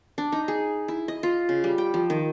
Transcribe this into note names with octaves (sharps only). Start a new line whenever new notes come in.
D4
D#4
G#4
E4
D#5
F4
C#3
G3
G5
F3
D#3